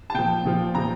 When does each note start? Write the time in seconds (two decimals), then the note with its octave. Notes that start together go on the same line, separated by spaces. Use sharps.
0.10 A5
0.14 A#2 F3 G5
0.45 A#2 F3
0.75 A#2 F3 A#5